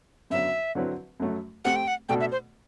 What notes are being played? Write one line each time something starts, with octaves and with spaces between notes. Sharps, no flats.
F#2 D3 F#3 B3 E5
D3 F#3 C4 E4 B4
F#2 F#3 A3
A3 C4 G4 F#5
G5
F#5
B2 A3 D4 F#4 A4 G5
E5
C5